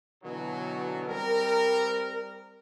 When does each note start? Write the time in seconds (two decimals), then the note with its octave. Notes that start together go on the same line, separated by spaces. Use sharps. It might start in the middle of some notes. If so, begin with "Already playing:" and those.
0.23 B2 D3 E3 F#3
1.08 G3 C4 A#4